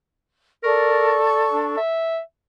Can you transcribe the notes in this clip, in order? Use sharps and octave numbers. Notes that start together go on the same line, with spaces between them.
A4 A#4 D5 C#6
D4
E5